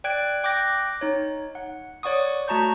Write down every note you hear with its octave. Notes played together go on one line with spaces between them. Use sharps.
D5 G5 F#6 G#6 D7
G5 D6 F#6 G6 A#6
D#4 C#5
F#5
C#5 D5 F#5 C#6 D#6
A3 F#4 A5 A#5 C#6 G6